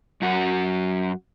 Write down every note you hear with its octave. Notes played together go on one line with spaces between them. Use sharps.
F#2 F#4